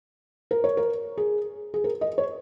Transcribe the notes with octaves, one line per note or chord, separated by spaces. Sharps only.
A#4
C#5
A#4
G#4
G#4
A#4
D#5
C#5